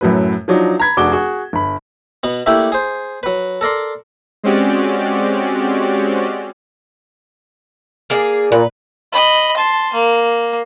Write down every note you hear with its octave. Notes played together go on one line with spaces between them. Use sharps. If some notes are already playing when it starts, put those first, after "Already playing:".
F#2 A2 F#3 B4
F3 F#3 D4 D#4
A#5 B5 G#6 B6
F1 D4 F#4 G#4 D6 G7
F#4 G#4
G1 B5
B2 B3
A3 A#3 D4 E4 G4
G#4 C5
F#3 B4
A4 A#4 D5 C6
G#3 C4 C#4 F#4 G4 D5
A#3 G#4 D5
A#2 B4
D#5 B5
A5 C6
A#3